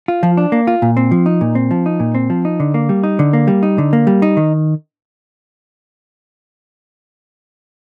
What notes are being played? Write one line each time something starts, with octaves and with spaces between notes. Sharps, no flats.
F4
F3
D4
A#3
F4
A#2
C4
F3
D#4
A#2
C4
F3
D#4
A#2
C4
F3
D#4
D3
A#3
G3
D#4
D3
A#3
G3
D#4
D3
A#3
G3
D#4
D#3